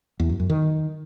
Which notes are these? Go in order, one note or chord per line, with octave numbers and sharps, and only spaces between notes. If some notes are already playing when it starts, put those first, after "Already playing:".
E2
F#2
F#2
D#3